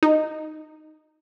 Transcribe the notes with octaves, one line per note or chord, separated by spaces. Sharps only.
D#4